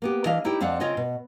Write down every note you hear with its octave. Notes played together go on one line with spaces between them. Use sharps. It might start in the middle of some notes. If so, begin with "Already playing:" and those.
A#3 B3 G4
E3 D4 D#5 F5
D#4 E4 G4 C#5 G5
F2 C4 D4 F5 F#5
C#3 C4 F4 C#5 D#5 G#5
B2